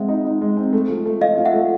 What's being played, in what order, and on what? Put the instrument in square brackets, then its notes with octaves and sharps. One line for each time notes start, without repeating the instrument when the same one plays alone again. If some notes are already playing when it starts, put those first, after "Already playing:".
Already playing: [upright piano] G#3 C4 [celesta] E5 F#5
[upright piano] D#4
D#4
G#3
C4
A3
F3
A3
[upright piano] F3 [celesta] D#5 F5
[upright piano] F3
[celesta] E5 F#5
[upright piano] A3